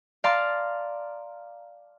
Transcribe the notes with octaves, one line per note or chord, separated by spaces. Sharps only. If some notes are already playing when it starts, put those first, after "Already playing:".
D5 F5 A5 A#5 C6